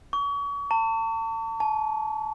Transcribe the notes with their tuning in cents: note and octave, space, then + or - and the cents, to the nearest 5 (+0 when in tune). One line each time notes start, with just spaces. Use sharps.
C#6 +35
A5 +40
A5 -35